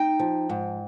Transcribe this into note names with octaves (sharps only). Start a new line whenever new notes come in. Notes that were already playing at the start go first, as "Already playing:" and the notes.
Already playing: D#4 G5
F3
G#2